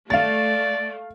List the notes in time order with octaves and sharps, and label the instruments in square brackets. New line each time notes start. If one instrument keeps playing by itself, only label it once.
[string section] A3 [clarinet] D5 [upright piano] F5 A6